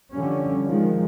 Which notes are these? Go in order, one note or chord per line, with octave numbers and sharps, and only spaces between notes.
D3 F3 G3 C#4
D#3 F3 G#3